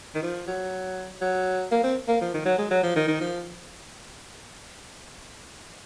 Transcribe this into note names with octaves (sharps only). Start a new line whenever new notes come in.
D#3
F3
F#3
F#3
A#3
C4
A#3
F3
D#3
F#3
G#3
F#3
F3
D#3
D#3
F3